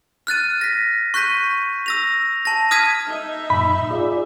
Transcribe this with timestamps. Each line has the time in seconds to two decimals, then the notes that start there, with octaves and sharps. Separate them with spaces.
0.27 F6 F#6 A6 D#7
0.61 A#6 B6
1.14 C#6 F#6 G6 B6 D#7
1.86 E6 A#6 F7
2.45 A5 A#6
2.71 D#6 F6 G#6 B6 D#7
3.07 D#4 E5
3.50 F#2 A#2 B5
3.90 F4 G#4 D5